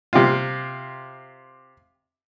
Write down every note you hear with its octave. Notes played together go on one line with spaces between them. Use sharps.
C3 F4